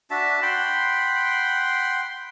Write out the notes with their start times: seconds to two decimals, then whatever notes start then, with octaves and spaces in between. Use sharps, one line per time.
0.11 D4 F#4 E5 A5
0.42 F#5 G5 B5 C6